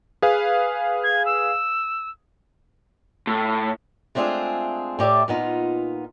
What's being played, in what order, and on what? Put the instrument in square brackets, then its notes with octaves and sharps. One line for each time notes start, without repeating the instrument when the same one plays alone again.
[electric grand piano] G#4 B4 F5
[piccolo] G#6
E6
[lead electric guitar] A2
[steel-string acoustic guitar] G#3 A3 C4 D4 F4 G#4
A2 G4 D5 E5 A5
A#2 B3 D#4 F4